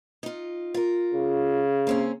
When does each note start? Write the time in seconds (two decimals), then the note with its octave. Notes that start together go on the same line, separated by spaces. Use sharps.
0.23 D#4 F4
0.74 F4 A#4
1.14 C#3
1.87 A#3 C4 C#4